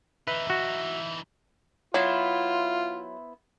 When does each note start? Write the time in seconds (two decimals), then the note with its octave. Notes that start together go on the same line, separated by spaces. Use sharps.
0.27 E3 D#4 B4 E5
0.50 F#4
1.94 F#3 B3 E4 F4 C5